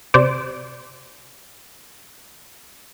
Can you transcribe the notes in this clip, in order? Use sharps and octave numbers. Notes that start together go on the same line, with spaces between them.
C3 C5 D5